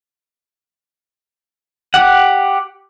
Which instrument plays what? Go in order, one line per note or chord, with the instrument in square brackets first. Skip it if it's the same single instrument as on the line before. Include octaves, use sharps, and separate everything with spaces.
[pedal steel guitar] G4 F#5